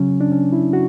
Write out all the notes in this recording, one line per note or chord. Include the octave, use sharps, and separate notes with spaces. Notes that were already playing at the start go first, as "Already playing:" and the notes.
Already playing: C#3 F#3 C#4
D4
C#4
E4
F#4